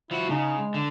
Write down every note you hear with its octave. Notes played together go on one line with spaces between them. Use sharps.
F3 E4 F#4
C#3 D#4
G#3
D3